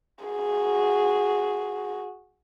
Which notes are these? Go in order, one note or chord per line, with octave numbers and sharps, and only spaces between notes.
F#4 G#4